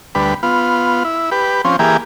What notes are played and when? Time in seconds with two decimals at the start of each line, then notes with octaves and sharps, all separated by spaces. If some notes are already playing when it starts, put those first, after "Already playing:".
0.15 D2 G3 B4
0.43 B3 F4
1.05 E4
1.31 G4 B4
1.65 F3 C4 C#4
1.79 E3 A#3 G4 G#4